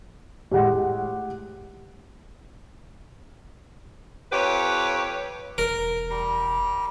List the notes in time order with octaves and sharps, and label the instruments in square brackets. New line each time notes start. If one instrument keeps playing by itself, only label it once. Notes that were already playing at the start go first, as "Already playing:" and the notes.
[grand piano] A2 G#3 [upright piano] G4 F#5
[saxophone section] F2 G4 B4 C#5
[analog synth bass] E1 [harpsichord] A#4
[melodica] G3 A#5